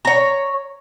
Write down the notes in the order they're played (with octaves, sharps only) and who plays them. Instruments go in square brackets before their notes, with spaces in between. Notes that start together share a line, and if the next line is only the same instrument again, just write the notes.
[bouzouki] C#5 A#5